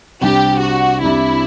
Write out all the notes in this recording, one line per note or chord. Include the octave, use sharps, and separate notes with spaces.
C2 C3 G3 D4 G4
F#4
C2 C3 G3 D4 E4